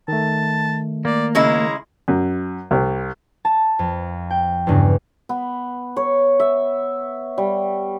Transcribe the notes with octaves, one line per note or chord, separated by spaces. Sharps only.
D#3 A3 A5
A#3 D5
C#3 G#3 E4 A#5
F#2
C2
A5
F2
G5
E2 G2 C#3
B3
C#5
E5
G3